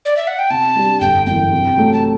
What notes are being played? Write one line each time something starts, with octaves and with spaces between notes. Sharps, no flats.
D5
E5
F#5
G5
C3 A5
G3 D4 G4
G1 G5
F#2 E3 G5
C3
F#3 A3
A5